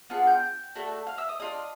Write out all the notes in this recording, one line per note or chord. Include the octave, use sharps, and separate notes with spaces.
B3 D4 F4 G#4 F#5 F#6
G5 G6
A3 D4 F#4 A4
F5 F6
E5 E6
D#5 D#6
D4 F4 G#4 D#5 D#6